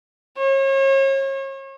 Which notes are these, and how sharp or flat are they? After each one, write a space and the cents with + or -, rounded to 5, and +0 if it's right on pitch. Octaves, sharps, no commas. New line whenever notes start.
C#5 -35